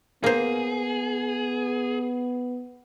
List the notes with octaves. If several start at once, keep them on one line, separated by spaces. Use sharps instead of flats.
A#3 B3 G#4 C5